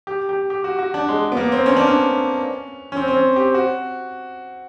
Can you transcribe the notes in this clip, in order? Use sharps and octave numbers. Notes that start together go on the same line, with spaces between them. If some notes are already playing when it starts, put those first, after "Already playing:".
G4
G4
G4
F#4
F#4
D4
G#3
B3
A#3
C4
C#4
D4
C#4
C#4
C4
C4
C#4
G4
F#4